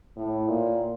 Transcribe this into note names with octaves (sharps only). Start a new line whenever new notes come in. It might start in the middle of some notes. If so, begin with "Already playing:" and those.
A2
A#2